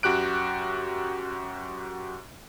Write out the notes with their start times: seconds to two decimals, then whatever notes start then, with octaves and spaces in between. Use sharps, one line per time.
0.03 F#2 F#4 G4 F#6 D7